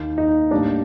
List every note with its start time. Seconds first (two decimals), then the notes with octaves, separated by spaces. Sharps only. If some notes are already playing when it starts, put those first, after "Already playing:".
Already playing: D#2 D#3 A#3
0.18 D#4
0.51 A2 G3 A#3 D4